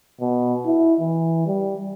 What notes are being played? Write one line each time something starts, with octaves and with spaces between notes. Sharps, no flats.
B2
E4
E3
G3